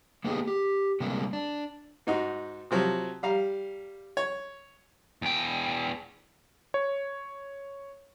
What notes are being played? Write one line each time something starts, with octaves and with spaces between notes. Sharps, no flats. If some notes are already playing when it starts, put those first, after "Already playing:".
A#3 B3 D#4 G4 G#4
G4
C3 G3 G#3 A#3 C4
D4
G#2 D#4 F#4
C3 F3 F#3
G3 F5 A#5
C#5
E2 G5
C#5